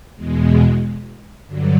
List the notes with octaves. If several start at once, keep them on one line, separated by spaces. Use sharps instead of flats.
E2 B2 G#3
G2 D3 F#3